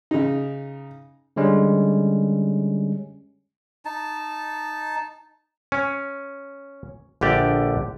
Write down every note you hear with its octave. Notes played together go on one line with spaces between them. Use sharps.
C#3 D#4
D3 G3 G#3 C#4
D#4 A5
C#4
A#1 D3 G4 D5